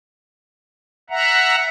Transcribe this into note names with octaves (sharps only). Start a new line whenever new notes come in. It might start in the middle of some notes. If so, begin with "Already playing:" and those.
E5 F#5 A#5